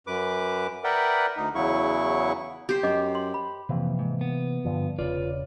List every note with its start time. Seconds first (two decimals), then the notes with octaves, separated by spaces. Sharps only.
0.07 F#2 B4 D6
0.84 A#4 B4 D5 E5 F#5 G5
1.37 D2 D#4
1.55 E2 C#3 F#3 E4 C#6
2.69 G4 C5
2.83 F#2 D#5 D6
3.15 C6
3.34 B5
3.69 F2 C3 E3 A#3
3.99 G#2
4.21 B3
4.65 G2 D3 F3
4.99 E1 C#3 F4 B4 D5